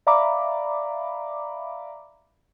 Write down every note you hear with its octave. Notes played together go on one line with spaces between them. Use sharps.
D5 E5 F5 A#5 B5 D6